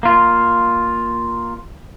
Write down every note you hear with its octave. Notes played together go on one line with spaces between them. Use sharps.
A#3 F4